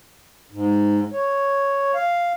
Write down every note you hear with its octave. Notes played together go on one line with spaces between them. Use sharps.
G#2
C#5
F5